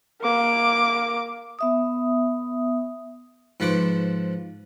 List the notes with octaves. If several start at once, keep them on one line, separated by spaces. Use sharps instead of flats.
A#3 D6
B3 E5 D#6
G#2 F3 B4 C5 C#6 D6